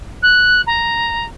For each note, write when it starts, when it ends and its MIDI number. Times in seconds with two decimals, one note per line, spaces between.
0.22 0.61 90
0.67 1.26 82